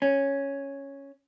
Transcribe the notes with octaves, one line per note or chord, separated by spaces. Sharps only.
C#4